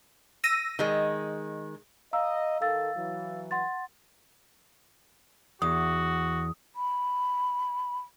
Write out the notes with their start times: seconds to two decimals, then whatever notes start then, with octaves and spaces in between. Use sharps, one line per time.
0.44 E6 A#6 D#7
0.79 D#3 G#3
2.13 D#5 F5 A#5 E6
2.61 D#3 A4 F5 E6 A6
2.95 E3 F#3
3.51 F#5 C6 A6
5.62 E2 F#4 D#6
6.74 B5